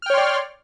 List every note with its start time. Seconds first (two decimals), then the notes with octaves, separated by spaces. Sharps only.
0.02 F6
0.06 G5
0.10 C#5
0.14 C6
0.17 D5